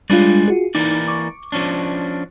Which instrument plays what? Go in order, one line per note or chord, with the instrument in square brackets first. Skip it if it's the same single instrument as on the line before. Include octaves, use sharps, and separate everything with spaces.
[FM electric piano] G3 D4 F4 [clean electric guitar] G#3 B4 D5
[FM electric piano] F4 F#4 G#4
[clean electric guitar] E3 A#3 D5 [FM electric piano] D#4
[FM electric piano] C#6 D6
[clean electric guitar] F3 C#4 D4